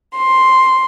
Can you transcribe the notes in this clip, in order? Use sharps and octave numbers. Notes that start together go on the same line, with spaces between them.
C6